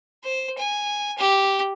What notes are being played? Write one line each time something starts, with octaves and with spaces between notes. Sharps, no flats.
C5
G#5
G4